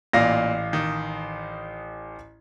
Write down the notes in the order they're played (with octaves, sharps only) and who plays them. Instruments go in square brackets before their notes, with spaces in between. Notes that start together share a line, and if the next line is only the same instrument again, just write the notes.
[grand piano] A1 F5 A#6 [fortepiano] A#2
[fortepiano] D#3